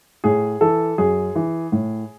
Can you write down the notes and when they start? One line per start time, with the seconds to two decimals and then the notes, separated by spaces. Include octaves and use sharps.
0.24 A2 G#4
0.61 E3 A4
0.98 F#2 G#4
1.35 E3
1.72 A2